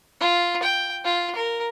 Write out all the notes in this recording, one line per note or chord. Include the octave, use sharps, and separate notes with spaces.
F4
G5
F4
A#4